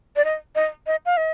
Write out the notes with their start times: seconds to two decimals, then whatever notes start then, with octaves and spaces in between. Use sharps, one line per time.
0.16 D5
0.24 D#5
0.55 D#5
0.87 D#5
1.06 F5
1.17 D#5